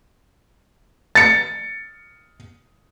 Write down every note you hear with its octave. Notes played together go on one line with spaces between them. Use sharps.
A6 C#7